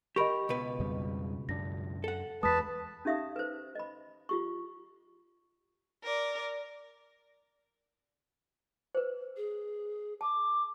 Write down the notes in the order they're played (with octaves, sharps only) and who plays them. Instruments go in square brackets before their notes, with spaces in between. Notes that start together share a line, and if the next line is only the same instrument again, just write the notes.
[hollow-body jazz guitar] G4 A#4 [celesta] D#5 B5 C#6
[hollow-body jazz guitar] C#2 B2 B4
[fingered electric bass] F2 C#3 G3
[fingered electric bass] F#2 D4 [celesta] A#6
[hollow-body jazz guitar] A4 F#5
[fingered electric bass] E2 G#3 [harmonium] B4 A5 [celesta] D#6 B6
[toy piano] C#4 D#4 G4 E5 F5 D#6
B4 C5
D#5 B5
F4 G4 C#6
[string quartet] A#4 D5
[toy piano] B4 C5
[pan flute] G#4
[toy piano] A5 [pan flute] D6